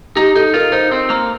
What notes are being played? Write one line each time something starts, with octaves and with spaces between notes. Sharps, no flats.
D#4 G4
D#4 A4
F4 A#4
D#4 C5
C4
A#3